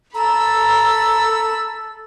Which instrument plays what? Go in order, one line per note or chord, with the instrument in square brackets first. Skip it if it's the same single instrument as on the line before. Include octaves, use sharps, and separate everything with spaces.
[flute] A4 [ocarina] A#5 [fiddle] B5 E6